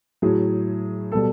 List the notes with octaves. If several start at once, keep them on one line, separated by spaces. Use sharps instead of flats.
A2 F#3 G#4
B2 G3 A4